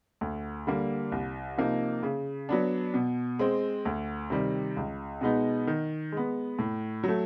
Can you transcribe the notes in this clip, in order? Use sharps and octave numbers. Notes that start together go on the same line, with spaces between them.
D2
D3 G3 A#3
C2
C3 F3 A#3 D#4
C#3
F#3 B3 D4
B2
G#3 C4
D2
C3 D#3 G3
C#2
B2 G#3 B3 D#4
D#3
G#3 B3
A2
F#3 A3